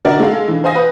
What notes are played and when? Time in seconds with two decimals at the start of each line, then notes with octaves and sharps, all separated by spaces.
0.05 D3 F#4 A#4 D5
0.20 G#3 A4 F5
0.48 E3 D4
0.64 C5 F5 G#5 D#6 A#6
0.75 B4